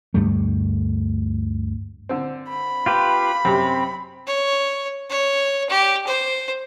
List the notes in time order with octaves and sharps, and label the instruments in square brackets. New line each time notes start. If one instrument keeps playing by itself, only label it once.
[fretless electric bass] D2 G2 G3 A3
[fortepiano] D3 C4
[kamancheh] B5
[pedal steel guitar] F4 G4 B4
[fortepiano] F#2 C3 G4 [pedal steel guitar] C4
[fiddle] C#5
C#5
G4
C5